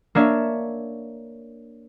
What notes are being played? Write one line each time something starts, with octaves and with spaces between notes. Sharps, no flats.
A#3 D4 C#5 E5